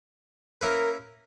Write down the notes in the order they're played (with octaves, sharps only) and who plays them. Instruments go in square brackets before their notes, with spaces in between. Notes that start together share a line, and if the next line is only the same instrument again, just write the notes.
[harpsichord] A#3 C#4 E4 B4 [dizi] A#4